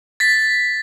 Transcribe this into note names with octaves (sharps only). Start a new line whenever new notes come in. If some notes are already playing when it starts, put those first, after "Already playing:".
A6 B6